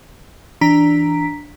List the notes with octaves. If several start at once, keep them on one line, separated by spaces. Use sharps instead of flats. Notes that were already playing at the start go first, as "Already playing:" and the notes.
E3 D4 A#5 B6